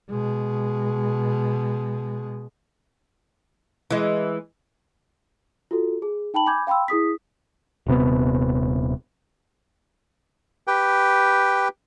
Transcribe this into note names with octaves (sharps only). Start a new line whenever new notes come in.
B2 G#3
E3 G#3
F4 F#4 A4
G#4
D#4 G5 A5 B5 F#7
G#5 B5 D6 G6 G#6
F5 G5 B5 C6 E6
E4 G#4 D#6 B6
D#1 C3 B3
G4 B4 G5